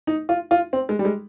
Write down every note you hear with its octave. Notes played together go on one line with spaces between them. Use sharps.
D#4
F4
F4
C4
G#3
G3
G#3